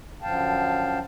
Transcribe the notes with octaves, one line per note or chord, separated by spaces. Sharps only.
F#2 D3 F3 F5 G5 A5